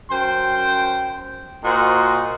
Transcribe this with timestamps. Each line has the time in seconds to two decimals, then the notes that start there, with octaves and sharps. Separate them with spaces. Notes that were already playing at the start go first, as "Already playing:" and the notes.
0.11 F#2 C5 G5 C6
1.64 A#2 F#4 C5 D#5